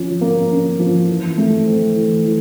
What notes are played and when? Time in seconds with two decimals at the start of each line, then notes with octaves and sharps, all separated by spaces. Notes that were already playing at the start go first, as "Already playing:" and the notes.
Already playing: F3 C#4 F4
0.21 A#3
0.51 C#4
0.79 F3
1.09 E3
1.38 A3
1.66 C4
1.96 E3
2.24 E3